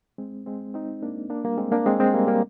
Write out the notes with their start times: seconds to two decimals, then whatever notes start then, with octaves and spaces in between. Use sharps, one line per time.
0.18 G#3 C4
0.46 G#3 C4
0.74 C4 D#4
1.02 A#3 D4
1.30 A#3 D4
1.44 G3 A#3
1.58 G#3 C4
1.72 A#3 D4
1.86 G#3 C4
2.00 G#3 C4
2.14 G3 A#3
2.27 G3 A#3